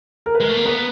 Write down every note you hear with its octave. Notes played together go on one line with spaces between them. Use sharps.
A#4
B4
G#3 A#4
A3
A#3
B3 B4